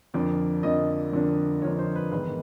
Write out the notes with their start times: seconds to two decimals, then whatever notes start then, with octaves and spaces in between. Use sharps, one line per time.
0.14 F2 D3 F3 A#3 D4 D5
0.63 F2 D3 F3 A#3 D4 D#5
1.12 F2 D3 F3 A#3 D4
1.62 F2 D3 F3 A#3 D4 C#5
1.79 C5
1.96 B4
2.12 A1 G#2 D#3 G#3 B3 B4